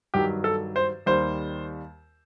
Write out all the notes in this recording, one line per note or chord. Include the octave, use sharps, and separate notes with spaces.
G2 D#3 F#3 G4
A4
C5
D#2 D#3 G3 C5